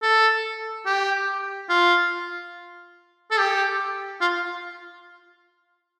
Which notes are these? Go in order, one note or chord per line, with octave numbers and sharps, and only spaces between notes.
A4
G4
F4
A4
G4
F4